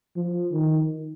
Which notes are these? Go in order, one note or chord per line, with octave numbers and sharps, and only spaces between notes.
F3
D#3